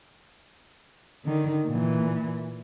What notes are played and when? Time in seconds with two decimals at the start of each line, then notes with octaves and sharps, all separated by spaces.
1.25 D3 D#3
1.67 A#2 E3